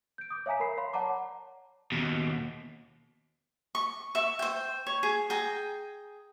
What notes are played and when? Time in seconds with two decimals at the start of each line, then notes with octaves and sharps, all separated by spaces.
0.18 G6 D7
0.30 D6 D#6
0.46 C#5 E5 F5 G#5 A#5 B6
0.60 A#4 B5 C7
0.77 C#5 F5 B5 C6
0.93 C#5 D5 F#5 A5 A#5 D6
1.92 D#2 B2
3.75 C#6
4.15 E5 C#6
4.39 C5 G5
4.87 C#5
5.03 G#4
5.30 G#4 G5 A#5